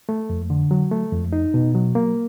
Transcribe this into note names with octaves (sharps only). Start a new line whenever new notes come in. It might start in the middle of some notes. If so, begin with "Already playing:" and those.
A3
F2
D3
F#3
A3
F2
D#4
B2
F#3
A#3